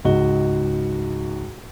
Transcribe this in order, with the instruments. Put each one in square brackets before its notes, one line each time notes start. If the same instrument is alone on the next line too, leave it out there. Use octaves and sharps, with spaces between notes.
[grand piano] C#2 G#2 F#4 D#5 G7